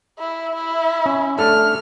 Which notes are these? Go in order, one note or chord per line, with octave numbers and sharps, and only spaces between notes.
E4
E4
C#4
A3 D4 A4 F6